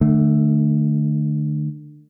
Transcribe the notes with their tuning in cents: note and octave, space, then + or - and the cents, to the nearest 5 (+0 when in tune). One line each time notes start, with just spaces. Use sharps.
D3 +35 A3 +0